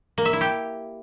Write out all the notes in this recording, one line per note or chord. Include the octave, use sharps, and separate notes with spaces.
A#3
E5
E4
G4